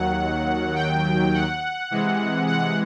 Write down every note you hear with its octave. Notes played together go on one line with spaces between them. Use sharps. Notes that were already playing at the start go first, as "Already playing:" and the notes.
Already playing: D#2 D#3 F#3 F#5
G5
F#5
C3 E3 G#3
F#5